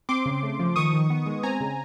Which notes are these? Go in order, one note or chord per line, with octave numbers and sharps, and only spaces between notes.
C4 C6 D6
C#3
A3
F3
D#3 C#6 D#6
D#3
B3
G#3
C4 G#5 A#5
C#3